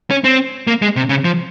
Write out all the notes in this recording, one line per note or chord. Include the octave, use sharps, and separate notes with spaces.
C#4
C4
A#3
G#3
C3
C#3
F3